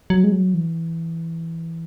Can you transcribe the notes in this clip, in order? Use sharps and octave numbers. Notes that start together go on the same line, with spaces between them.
F#3
G#3
F#3
E3